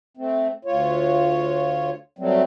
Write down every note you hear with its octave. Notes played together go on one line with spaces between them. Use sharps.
A3 C4
D2 F4 C#5
F#3 G3 A3 C4